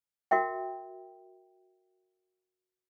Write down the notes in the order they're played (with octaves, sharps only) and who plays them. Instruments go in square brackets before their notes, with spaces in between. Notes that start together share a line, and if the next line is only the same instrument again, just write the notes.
[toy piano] F#4 A#4 E5 G5